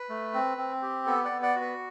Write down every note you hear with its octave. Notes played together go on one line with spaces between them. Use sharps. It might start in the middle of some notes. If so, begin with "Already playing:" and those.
Already playing: B4
A3
C4
C4
G4
B3 A4
D5 F#5
B3
D5 F#5
F#4
B4